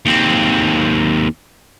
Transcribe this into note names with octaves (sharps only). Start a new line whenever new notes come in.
D#2 C4